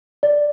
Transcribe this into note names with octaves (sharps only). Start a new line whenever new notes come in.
D5